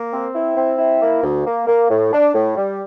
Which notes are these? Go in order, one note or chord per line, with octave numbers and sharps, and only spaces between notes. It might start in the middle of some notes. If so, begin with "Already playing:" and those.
Already playing: A#3
C4
E4
C4
E4
A#3
D2
A#3
A#3
A2
D4
A2
G3